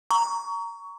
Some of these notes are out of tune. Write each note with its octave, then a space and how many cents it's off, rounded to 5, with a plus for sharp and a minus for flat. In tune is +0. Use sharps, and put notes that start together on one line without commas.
A#5 -5 C#6 +25